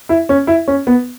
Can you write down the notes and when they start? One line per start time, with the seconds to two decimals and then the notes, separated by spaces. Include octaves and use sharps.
0.09 E4
0.29 C#4
0.47 E4
0.68 C#4
0.87 B3